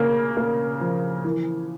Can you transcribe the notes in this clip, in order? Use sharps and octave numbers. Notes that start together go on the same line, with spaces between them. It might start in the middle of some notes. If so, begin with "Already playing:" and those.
Already playing: C#3 A#3
A#3
F3
E3